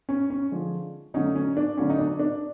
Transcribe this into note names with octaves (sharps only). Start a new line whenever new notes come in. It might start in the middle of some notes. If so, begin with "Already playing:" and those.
C#4
C#4
D3 F3 G#3
D3 F#3 A3 C#4 D#4
C#4
D4
D3 F#3 A3 C#4
D#4
D4
D4